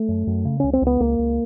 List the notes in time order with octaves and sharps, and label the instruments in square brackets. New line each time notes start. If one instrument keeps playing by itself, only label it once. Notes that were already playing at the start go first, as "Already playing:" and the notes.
Already playing: [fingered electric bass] A3
F#2
F#2
C#3
C#2 C#4
C4
C#2 B3
C#2 A#3
C#2